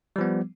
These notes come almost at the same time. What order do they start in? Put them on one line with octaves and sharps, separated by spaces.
G3 F3 B3